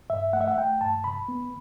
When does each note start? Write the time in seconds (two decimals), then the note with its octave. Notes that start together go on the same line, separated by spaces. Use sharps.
0.10 G2 E5
0.33 A3 F#5
0.41 E5
0.48 F#5
0.58 A3 G5
0.81 G2 A5
1.04 C3 B5
1.28 B3